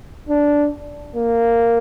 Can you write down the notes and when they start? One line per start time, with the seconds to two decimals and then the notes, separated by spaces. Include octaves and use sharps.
0.29 D4
1.16 A#3